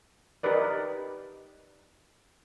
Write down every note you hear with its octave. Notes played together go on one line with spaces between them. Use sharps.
D#4 G4 A#4 B4 D5